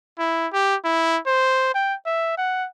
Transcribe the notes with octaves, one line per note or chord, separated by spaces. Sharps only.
E4
G4
E4
C5
G5
E5
F#5